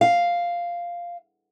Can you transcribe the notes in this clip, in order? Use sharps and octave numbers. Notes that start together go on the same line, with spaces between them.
F5